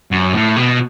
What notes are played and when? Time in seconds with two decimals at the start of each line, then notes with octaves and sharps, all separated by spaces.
0.11 F#2
0.34 A2
0.56 B2